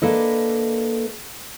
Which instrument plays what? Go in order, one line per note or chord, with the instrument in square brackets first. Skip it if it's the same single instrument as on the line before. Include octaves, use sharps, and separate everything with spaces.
[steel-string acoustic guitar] A#3 D4 A4 B4 D#5